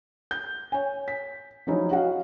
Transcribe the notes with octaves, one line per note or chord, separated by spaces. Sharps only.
G6
C#5 G#5
B6
F3 F#3 C#4 D#4 E4
F#4 D#5 F5 F#5